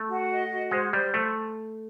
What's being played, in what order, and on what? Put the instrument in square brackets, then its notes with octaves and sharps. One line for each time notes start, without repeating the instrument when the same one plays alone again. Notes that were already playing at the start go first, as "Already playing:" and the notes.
Already playing: [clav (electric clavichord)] A3
[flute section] F#4
D#5
F#4
[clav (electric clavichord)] G#3 [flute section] C5
[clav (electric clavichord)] G3 [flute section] C5
[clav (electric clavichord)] A3 [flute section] C5